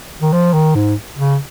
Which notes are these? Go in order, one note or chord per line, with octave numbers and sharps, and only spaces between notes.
D#3
F3
D#3
G#2
C#3